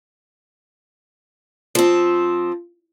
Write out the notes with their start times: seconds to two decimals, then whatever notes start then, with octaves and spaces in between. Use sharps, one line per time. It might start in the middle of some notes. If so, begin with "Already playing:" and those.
1.75 F3 C4